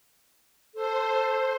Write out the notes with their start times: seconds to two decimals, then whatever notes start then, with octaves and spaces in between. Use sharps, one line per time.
0.75 A4 C5